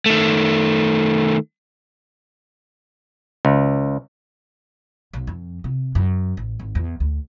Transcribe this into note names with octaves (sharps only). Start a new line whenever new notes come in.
D#3 A3
C#2
B1
F2
C3
F#2
A1
G#1
E2
D2